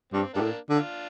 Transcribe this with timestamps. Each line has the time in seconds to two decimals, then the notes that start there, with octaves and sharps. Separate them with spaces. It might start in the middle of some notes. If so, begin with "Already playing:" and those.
0.13 G2 F3 C4
0.34 G2 A#3 D4
0.40 A2
0.69 D3
0.77 D4 F4